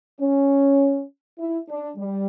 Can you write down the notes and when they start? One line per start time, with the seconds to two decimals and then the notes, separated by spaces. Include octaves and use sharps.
0.20 C#4
1.39 E4
1.69 D4
1.97 G3